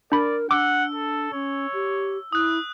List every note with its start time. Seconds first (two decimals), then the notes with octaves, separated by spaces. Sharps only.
0.12 D4 A#4 D5 B5
0.51 D4 F#5 D6 E6
0.95 A4
1.33 C#4 C#5
1.74 G4
2.33 E4 D#6 F#6